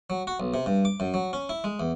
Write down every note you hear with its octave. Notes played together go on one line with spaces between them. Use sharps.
F#3
F#4
B1
C3
G2
D6
F#2
F#3
C#4
E4
G#3
E2